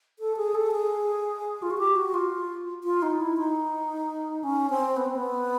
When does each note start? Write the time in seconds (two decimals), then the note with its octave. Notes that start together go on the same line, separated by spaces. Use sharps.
0.19 A4
0.37 G#4
0.55 A4
0.72 G#4
1.62 F4
1.71 F#4
1.78 G4
1.96 F#4
2.14 F4
2.84 F4
3.02 D#4
3.20 E4
3.37 D#4
4.43 C#4
4.70 C4
4.97 B3
5.06 C4
5.15 B3